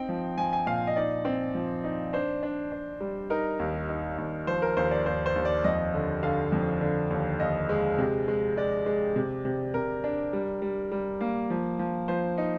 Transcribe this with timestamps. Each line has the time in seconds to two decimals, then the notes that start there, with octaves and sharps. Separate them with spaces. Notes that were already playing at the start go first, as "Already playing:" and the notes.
Already playing: C4 D#4 G5
0.09 F3
0.38 F3 G#5
0.53 G#5
0.66 A#2 F5
0.87 D#5
0.96 D#4 D5
1.25 C4
1.54 F3
1.84 D#4
2.13 D4 C5
2.43 D4
2.72 D4
3.00 G3
3.30 D#4 A#4
3.59 D#2
3.89 D#4
4.18 D#2
4.47 F3 C5
4.62 A#4
4.77 D#2 C5
4.91 D5
5.06 D#2 C5
5.26 C5
5.36 D#2
5.45 D5
5.64 F2 D#5
5.94 D3
6.23 D3 F5
6.52 F2
6.81 D3
7.10 D#2
7.40 D#2 D#5
7.69 G#3
7.98 C3
8.28 G#3
8.57 G#3 D5
8.86 G#3
9.16 C3
9.45 C3
9.74 C3 A#4
10.04 D4
10.33 G3
10.62 G3
10.92 G3
11.21 A#3
11.50 F3
11.79 F3
12.08 F3 C5
12.38 D#4